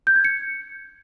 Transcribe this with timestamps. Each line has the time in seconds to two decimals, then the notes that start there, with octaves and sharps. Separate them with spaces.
0.07 G6
0.16 G#6
0.25 C#7